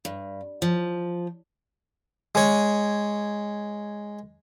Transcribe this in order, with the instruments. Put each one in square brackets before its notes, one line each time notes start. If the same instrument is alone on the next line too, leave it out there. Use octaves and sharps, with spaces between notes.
[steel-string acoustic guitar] G2
F3
[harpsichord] G#3 C#5